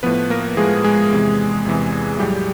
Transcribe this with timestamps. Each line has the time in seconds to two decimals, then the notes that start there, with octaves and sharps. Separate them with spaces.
0.03 A2 F3 B3 B4
0.30 A#3 A#4
0.57 A2 F3 G#3 G#4
0.84 G#3 G#4
1.11 E2 C3 E3
1.65 E2 C3 E3
2.19 A2 F#3 G3 G4